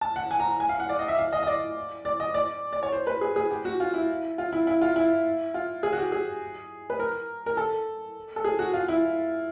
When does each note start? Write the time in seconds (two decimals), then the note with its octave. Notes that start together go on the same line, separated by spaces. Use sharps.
0.01 A5
0.16 F#5
0.31 G#5
0.40 A#5
0.60 G#5
0.69 F5
0.80 F#5
0.89 D5
0.99 D#5
1.08 E5
1.18 F5
1.33 D#5
1.43 D#5
1.47 D5
2.05 D5
2.20 D#5
2.34 D5
2.73 D5
2.83 C#5
2.92 C5
3.07 B4
3.21 G#4
3.36 G#4
3.51 G4
3.65 F#4
3.80 F4
3.94 E4
4.38 F4
4.53 E4
4.67 E4
4.81 F4
4.96 E4
5.54 F4
5.83 G#4
5.93 F#4
5.98 G4
6.12 G#4
6.90 B4
7.00 A#4
7.46 A#4
7.57 A4
8.36 A4
8.44 G#4
8.59 F#4
8.73 F4
8.88 E4